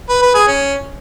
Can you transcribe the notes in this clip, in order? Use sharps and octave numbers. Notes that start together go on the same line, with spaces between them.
B4
B4
G#4
C#4